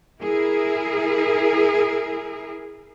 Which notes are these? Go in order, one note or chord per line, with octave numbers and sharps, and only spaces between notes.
E4 G#4 A#4